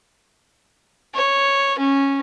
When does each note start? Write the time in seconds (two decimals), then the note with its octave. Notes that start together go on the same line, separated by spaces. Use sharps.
1.14 C#5
1.78 C#4